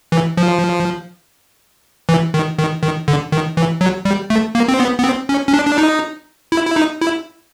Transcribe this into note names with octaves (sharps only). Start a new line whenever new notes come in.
E3
F3
E3
D#3
D#3
D#3
D3
D#3
E3
F#3
G3
A3
A#3
C4
B3
B3
C4
C#4
C#4
D4
D4
D#4
E4
E4
D#4
E4